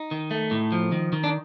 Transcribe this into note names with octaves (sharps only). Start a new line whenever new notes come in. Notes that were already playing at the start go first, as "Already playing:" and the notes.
Already playing: D#4
D#3
A3
A2
F3
D#3
D#3
D4